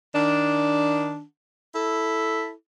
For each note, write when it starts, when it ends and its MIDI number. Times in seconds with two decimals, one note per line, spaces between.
0.14 1.21 51
0.14 1.21 62
1.74 2.51 64
1.74 2.51 69